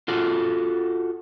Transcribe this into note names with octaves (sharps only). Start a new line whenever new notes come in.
F4 F#4 A4